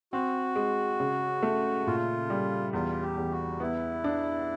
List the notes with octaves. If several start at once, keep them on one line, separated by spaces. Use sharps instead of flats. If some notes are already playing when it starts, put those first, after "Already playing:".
C4 F#4
G#3
C#3
A3
A#2 F4
G3
E2 F4
G4
E2
F#4
B3 E4
D4